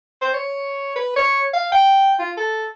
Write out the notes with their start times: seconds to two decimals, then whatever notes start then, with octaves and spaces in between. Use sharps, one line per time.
0.21 C5
0.34 C#5
0.96 B4
1.16 C#5
1.53 F5
1.72 G5
2.19 F4
2.37 A4